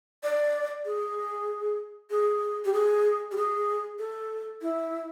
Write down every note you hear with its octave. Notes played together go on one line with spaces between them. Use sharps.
D5
G#4
G#4
G4
G#4
G4
G#4
A4
E4